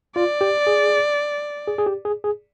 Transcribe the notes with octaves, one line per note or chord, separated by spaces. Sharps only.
F4 D5
G4
G#4
G#4
G#4
G4
G#4
G#4